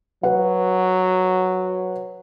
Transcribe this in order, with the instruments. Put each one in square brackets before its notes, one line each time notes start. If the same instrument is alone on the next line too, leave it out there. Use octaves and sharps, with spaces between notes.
[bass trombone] F#3 [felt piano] B4 F#5